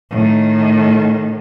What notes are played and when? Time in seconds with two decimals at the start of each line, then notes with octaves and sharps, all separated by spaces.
0.10 A2 D#3